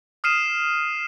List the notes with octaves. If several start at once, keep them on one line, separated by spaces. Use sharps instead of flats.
D#6 F6 C7 D#7 E7